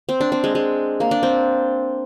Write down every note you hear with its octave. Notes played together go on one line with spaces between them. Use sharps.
C4
D4
C4
G#3
G#3
A#3
D4
C4